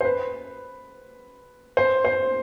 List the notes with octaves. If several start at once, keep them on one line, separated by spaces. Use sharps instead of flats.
C5
B4
C5
C5